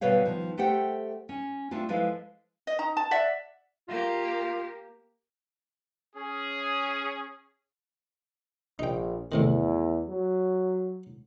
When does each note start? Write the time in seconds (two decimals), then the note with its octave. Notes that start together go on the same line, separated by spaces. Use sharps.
0.01 B2 D3 G3 B4 C#5 F5
0.25 D#3 F3
0.58 A3 G4 A4 C5 F#5 G5
1.29 C#4
1.71 A3 C4 D4 F4
1.89 F3 G#3 E4 A4 B4 F5
2.67 D#5
2.79 D#4 A#5
2.97 A5
3.11 D5 E5 F#5
3.88 A#3 F4 G4
6.16 C#4 G#4
8.79 A#1 D#4 G5
9.32 E2 A2 C3 D#3
10.08 F#3